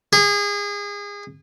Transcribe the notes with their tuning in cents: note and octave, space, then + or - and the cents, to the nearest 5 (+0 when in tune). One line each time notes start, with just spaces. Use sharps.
G#4 -30